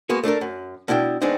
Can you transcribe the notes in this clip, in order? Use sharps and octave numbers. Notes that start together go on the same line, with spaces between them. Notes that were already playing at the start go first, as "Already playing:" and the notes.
G#3 A#3 B3 F#4
A3 D4 A4 A#4
F#2
B2 D4 E4 D#5 G5
D#3 G#3 B3 C4 D4 D#4